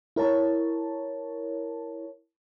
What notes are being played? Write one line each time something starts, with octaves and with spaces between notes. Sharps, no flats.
E4 A#4 C#5 A5